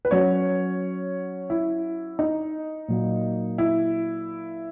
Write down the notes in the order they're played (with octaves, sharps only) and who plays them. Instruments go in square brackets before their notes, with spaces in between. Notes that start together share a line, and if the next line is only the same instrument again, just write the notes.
[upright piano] B4
[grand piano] F#3 C#4 F#4 [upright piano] C#5
[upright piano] E4
D#4
[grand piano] A#2 F#3 A#3
[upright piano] E4